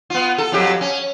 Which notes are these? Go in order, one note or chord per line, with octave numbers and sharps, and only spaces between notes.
B3 F4
A4
F2 F#3 G4
C#4